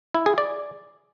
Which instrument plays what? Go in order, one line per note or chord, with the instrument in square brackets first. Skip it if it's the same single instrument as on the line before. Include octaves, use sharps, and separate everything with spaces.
[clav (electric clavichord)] E4
G#4
D5